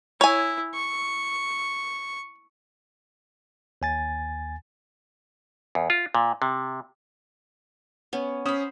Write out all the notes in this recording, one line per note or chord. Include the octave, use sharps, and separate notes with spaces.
E4 C#5 G#5
C#6
D#2 G#5 A6
E2
F4
A#2
C3
B3 C#4
C#4 C5 B5 D#6